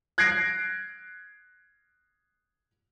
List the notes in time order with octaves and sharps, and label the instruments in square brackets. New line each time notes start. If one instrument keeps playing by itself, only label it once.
[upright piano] F#6 G#6 A#6 C7 D7